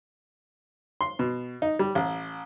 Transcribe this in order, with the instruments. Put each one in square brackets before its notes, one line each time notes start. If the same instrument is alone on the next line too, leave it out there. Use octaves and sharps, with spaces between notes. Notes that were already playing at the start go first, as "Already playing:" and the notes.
[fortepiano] C6
B2
D#4
G3
A1